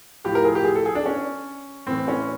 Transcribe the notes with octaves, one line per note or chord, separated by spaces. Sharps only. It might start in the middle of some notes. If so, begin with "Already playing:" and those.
A2 F3 G4
A#4
G#4
G4
G#4
A4
G#4
D4
C#4
A2 E3 C4
C#4